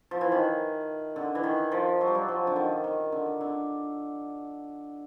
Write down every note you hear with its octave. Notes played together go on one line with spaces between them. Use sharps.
F3
E3
D#3
D3
E3
D#3
F3
F#3
G3
F#3
F3
D3
D#3
D#3
D3
D3